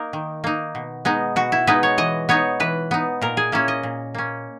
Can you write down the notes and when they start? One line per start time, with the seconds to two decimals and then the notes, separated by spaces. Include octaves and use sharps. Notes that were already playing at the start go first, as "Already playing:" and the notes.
Already playing: A#3 D#4 A#4
0.13 D#3
0.44 A#3 D#4
0.75 B2
1.05 G#3 B3 D#4
1.36 B2 F#4
1.52 E4
1.67 G#3 B3 D#4 B4
1.83 C#5
1.98 E3 D#5
2.29 B3 D#4 C#5
2.60 E3 B4
2.91 B3 D#4
3.21 A#2 A#4
3.37 G#4
3.52 A#3 C#4 E4
3.68 D#5
3.83 A#2
4.14 A#3 C#4